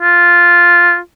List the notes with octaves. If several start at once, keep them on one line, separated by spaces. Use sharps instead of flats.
F4